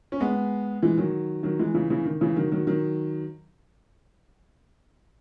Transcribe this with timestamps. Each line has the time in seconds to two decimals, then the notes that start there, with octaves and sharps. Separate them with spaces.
0.12 C#4
0.20 G#3 B3
0.82 E3 G#3
0.98 D#3 F#3
1.43 D#3 F#3
1.59 E3 G#3
1.74 C#3 E3
1.90 C#3 E3
2.05 D#3
2.21 C#3 E3
2.36 D#3 F#3
2.52 D#3 F#3
2.67 D#3 F#3